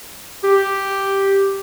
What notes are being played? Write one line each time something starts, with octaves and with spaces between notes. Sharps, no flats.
G4